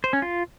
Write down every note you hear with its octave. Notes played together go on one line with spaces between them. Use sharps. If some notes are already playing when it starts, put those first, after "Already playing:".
C5
C#4
F4